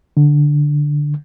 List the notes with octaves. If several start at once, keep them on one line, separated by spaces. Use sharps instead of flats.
D3